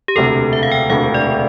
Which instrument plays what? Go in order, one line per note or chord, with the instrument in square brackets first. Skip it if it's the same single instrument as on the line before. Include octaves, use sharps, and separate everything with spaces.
[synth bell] G4
[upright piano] E1 D2 C3 [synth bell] A4
[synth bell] E5
F5
G5
[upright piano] E1 D2 C3 [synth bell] F5
[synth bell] D5